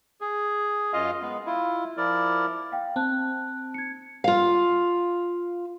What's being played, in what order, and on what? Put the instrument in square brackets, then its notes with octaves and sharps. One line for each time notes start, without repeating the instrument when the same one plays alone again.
[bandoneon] G#4
F#2 F4 D#5 F5
G#3 B3
E4 F4
F3 E4 A#4 D5
[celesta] F5 G5
[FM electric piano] C4 [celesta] A5 F#6
[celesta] G#6 C#7
[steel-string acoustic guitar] F4 F5